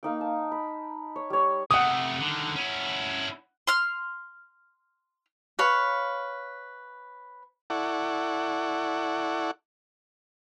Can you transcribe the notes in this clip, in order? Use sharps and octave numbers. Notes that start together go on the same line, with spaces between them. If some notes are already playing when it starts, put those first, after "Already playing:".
A#3 D#4 G5
A5
B5
C#5
G3 C#5
C3 A3 F#5 D#6
D3 D#3
C#4 E4
C6 F6
B4 C#5 F5
E4 A4 D5 F#5 C#6